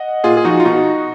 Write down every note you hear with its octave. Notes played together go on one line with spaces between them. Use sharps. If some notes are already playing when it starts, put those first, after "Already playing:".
Already playing: D#5 F#5
A#2 F4 G#4
G#4
F3 D#4 F#4
F4
B2 D#4 F#4